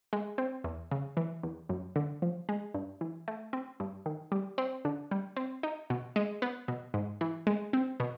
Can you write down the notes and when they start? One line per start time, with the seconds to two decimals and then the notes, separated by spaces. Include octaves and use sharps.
0.13 G#3
0.38 C4
0.64 E2
0.91 C#3
1.17 E3
1.43 E2
1.69 F#2
1.96 D3
2.22 F3
2.49 G#3
2.74 G2
3.01 E3
3.28 A3
3.53 C4
3.80 G2
4.06 D#3
4.32 G3
4.58 C4
4.85 D3
5.11 G3
5.37 C4
5.63 D#4
5.90 B2
6.16 G#3
6.42 B3
6.68 B2
6.94 G#2
7.21 E3
7.47 G#3
7.73 C4
8.00 B2